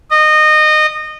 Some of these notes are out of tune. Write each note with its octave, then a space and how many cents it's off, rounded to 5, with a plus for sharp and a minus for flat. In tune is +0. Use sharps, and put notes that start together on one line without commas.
D#5 -20